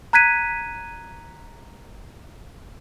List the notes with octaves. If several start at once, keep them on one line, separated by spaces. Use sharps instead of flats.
A#5 F#6 G#6 B6 D#7